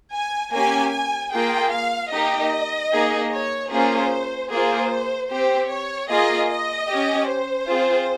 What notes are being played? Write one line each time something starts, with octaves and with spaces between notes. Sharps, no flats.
G#5
A#3 C#4 G4 G#5
G#5
A#3 F4 G#4 G5
F5
A#3 D#4 G4 D#5
A#3 D#4 G#4
C#5
A#3 C#4 F4 G#4 C5
A#3 F4 G#4 C5
C4 G4 C5
C#5
A#3 F4 G#4 D#5
D#5
C#4 G4
C5
C4 F4 G#4